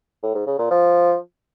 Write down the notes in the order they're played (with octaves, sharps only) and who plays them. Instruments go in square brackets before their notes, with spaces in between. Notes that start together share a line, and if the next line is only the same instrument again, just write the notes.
[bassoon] A2
G#2
C#3
A#2
F3